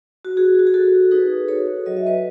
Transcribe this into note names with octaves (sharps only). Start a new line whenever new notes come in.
F#4
F#4 G#4
F#4
G#4
F#4 A4
D#4 G#4 B4
F#4 A4 C#5
F#3 D#5
E5
B4 D#5